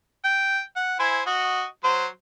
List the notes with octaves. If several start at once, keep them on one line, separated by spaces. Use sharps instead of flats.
G5
F#5
E4 C5 G#5
F#4 D#5
F#3 C5